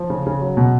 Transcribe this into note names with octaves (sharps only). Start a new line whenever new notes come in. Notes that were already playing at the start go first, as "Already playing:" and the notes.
Already playing: F3
C#3
C#3
F#3
B2